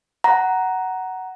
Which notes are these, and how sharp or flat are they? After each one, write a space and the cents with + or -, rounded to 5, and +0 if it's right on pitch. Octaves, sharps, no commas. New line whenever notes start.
F#5 +10 A#5 +5